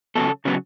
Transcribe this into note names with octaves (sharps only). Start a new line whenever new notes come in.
C#3 F#3 B3 A4
C#3 F#3 B3 C#4